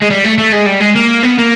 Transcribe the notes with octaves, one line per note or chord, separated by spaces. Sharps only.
G#3
G3
A3
A3
G#3
G3
G#3
A#3
B3
A#3